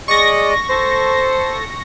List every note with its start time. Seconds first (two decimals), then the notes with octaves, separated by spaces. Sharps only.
0.08 G#3 D5 D#5 C#6 A#6
0.70 A4 C5